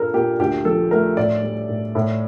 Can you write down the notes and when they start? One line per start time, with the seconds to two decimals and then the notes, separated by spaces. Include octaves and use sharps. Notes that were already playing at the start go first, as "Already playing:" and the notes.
Already playing: G2 A#2 A#3 A4 A#4
0.14 A#2 G4
0.39 D2 G4
0.65 F3 A4
0.91 A3 A#4
1.17 A2 D5
1.43 G3
1.69 A2
1.95 A2